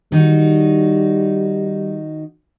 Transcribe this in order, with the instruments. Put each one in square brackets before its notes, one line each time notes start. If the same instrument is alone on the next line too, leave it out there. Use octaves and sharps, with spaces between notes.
[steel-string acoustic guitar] D#3 D#4 F#4 [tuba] G3